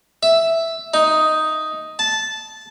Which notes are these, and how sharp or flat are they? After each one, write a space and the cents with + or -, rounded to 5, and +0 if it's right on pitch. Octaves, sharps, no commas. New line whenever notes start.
E5 +0
D#4 +5
A5 -10